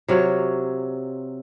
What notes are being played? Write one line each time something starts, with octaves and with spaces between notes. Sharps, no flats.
C3 F#3 F4 C#5